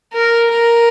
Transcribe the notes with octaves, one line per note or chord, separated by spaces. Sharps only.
A#4
A#4